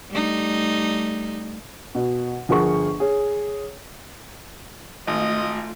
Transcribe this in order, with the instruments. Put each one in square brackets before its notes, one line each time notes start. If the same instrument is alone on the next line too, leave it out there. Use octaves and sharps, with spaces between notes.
[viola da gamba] G3 A3 D#4
[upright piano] B2
G1 F3 G#4 A#4 F#5 C#6
G#4 C#5
[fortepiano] G#1 [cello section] A3 F4 [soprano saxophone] D#5